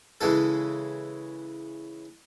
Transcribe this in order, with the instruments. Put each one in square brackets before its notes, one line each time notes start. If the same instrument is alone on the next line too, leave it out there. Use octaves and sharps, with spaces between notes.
[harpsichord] C#3 E3 G#3 A4